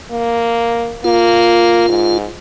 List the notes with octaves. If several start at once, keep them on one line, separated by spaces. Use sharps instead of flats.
A#3
A#3 F4
G#2